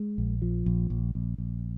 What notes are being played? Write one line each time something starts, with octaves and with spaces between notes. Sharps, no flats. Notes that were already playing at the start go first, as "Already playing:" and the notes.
Already playing: G#3
A#1
F3
A#1
A#1
A#1
A#1